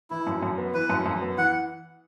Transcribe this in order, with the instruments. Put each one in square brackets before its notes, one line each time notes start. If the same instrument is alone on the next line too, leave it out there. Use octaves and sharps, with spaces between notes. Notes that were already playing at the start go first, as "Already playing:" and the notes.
[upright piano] E3 [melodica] E4
[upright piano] F#2
F#2
B3
[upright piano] E3 [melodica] B4
[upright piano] F#2
F#2
B3
[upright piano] E3 [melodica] F#5